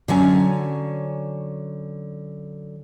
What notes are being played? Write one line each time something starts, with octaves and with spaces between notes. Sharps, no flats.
D3 F#3 C#4 G#5